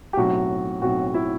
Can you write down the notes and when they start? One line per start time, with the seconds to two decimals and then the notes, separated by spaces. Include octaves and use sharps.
0.13 G4
0.17 B1 A2 F#3 C4 F#4
0.81 B1 A2 F#3 C4 F#4
1.07 F#4
1.14 E4